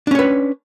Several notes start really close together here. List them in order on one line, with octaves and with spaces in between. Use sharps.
D4 C#4 C#5 B4